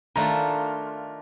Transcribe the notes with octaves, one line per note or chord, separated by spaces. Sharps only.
D#3 A3 D4 F4 A#5